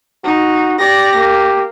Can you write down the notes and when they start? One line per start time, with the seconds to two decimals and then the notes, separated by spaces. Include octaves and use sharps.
0.25 D#4 F#4
0.79 G4 D5 A#6
1.16 A#3